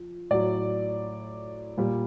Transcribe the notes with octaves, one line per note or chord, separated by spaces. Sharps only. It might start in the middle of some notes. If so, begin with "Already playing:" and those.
Already playing: F3
A2 F#3 D5
A#2 G3